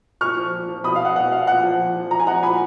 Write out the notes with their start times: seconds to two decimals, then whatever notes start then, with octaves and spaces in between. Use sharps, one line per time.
0.21 A#2 C#6 F6
0.36 F3
0.53 A#2
0.69 F3
0.84 B2 B5 D#6
0.95 F5
1.05 F#5
1.16 B2 F#5
1.32 F5
1.47 A#2 F#5
1.64 F3
1.80 A#2
1.95 F3
2.11 A#2 A#5
2.20 G#5
2.26 F3 F#5 A#5
2.43 A#2 G#5 B5